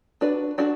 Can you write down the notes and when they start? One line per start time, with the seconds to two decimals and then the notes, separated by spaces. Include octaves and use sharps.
0.21 D4 F#4 B4 D5
0.58 D4 F#4 A4 D5